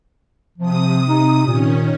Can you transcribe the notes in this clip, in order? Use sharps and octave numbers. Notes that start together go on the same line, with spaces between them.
C3 F3 D#6
D#4
A#2 D#3 C#4